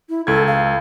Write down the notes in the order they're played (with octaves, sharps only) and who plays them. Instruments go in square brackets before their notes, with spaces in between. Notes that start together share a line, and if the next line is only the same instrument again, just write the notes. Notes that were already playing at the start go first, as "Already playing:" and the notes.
[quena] E4
[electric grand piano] C#2 G#6 [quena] A4
[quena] F5